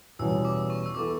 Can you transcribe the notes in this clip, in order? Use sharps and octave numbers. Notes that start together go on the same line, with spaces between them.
E2 B2 G3 C#4 E6
D6
C#6
E6
E3 B3 E4 A4 D6